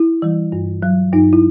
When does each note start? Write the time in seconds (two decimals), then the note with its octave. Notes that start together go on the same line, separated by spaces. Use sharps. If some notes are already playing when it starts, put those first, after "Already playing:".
Already playing: E4
0.22 E3 G3
0.52 G2
0.83 F#3
1.13 G2 D#4
1.33 E4